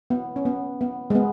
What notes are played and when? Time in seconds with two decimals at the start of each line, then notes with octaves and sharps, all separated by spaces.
0.10 B3
0.36 C#4
0.45 B3
0.81 B3
1.10 G#3
1.15 B3